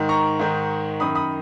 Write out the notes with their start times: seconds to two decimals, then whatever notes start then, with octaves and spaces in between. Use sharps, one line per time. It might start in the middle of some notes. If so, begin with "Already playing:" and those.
Already playing: G#2 D#3
0.09 A#5 C#6
0.39 G#2 D#3
1.00 F#2 D#3 B5 D#6
1.15 B5 D#6